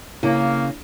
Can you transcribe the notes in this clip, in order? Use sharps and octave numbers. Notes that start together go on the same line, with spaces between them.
C#3 A#3 E4